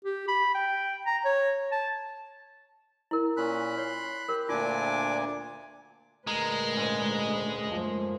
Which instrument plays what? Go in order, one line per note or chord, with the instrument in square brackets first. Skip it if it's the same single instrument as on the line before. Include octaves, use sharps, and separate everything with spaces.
[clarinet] G4
B5
G5
A#5
C#5
A5
[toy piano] E4 A#4
[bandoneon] A#2 C#4 [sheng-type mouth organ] B5 F#6
[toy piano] C#5 [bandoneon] C6
[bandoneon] G4 [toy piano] A#4
[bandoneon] D2 A#2 G#5 [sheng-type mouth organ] D4 D6 [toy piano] F4
[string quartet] D2 A#2 B4 [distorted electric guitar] G#3 [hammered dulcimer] A#4
[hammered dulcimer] G#2 C#3
[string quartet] F#2 A3 A#3 [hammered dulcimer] F3